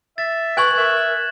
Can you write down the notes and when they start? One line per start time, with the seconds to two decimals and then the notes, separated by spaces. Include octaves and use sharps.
0.18 E5 A6
0.57 B4 G#5 C#6 F#6 G#6 F#7
0.77 A#4 E5